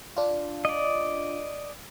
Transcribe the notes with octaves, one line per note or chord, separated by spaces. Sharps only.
D4 F4
D5 D#5